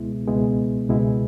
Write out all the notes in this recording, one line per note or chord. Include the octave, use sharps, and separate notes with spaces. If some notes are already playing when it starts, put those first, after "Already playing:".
Already playing: C#2 B2 G#3 B3 E4
C#2 B2 G#3 B3 E4
C#2 B2 G#3 B3 E4